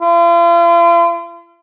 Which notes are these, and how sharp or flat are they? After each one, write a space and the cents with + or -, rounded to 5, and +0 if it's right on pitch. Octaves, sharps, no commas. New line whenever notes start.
F4 -40